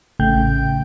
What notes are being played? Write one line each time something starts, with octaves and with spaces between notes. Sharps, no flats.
A1 C#3 A3 G5 G6